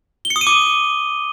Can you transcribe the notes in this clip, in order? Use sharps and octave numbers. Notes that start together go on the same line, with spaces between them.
G7
C#7
D#6
D#7
D6